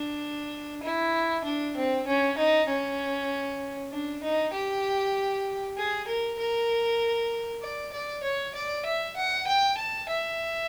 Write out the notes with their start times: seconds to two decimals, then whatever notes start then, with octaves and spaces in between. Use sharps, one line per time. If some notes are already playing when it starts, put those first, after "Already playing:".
Already playing: D4
0.83 E4
1.44 D4
1.76 C4
2.07 C#4
2.38 D#4
2.68 C#4
3.91 D4
4.23 D#4
4.53 G4
5.77 G#4
6.07 A#4
6.39 A#4
7.62 D5
7.93 D5
8.23 C#5
8.55 D5
8.85 E5
9.16 F#5
9.47 G5
9.78 A5
10.09 E5